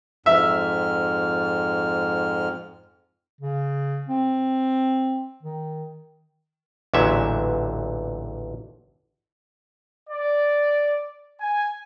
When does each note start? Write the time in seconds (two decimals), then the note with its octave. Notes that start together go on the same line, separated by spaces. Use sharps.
0.26 F2 G#2 E5 F6
3.41 C#3
4.09 C4
5.43 D#3
6.94 A1 E2 A#2 D3 F#3 E5
10.09 D5
11.41 G#5